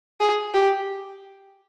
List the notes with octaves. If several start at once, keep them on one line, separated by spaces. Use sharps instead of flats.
G#4
G4